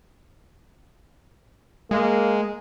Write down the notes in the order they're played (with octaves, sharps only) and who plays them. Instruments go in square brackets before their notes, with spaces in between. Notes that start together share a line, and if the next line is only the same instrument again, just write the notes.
[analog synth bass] G#3 [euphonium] A#3